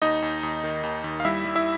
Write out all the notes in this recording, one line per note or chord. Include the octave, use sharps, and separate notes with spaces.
D#2 D#4 D#5
D#2
D#2
D#3
D#2
D#2
F5
G3 E4 E5
G3
E4 E5